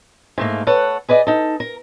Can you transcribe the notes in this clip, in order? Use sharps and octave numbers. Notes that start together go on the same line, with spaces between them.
G#2 A3 A#3
A4 B4 C#5 F#5
G#4 B4 D5 D#5
D#4 A4
A#4